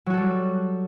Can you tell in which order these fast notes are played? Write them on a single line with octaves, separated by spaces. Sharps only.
F#3 F#4 A4 G3